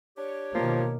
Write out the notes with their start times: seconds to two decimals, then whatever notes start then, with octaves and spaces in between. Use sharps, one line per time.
0.18 D4 G4 C#5
0.55 B2 D#3 F3 A#3